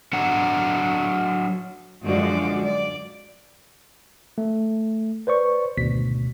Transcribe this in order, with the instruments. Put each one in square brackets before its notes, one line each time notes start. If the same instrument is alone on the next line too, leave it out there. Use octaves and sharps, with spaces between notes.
[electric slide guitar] F#3 D4 A4 F#5 A#5
[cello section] F#2 D3 F3 G#3 F#4 D5
D5
[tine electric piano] A3
B4 C5 D5 C#6
G#1 D2 B2 B6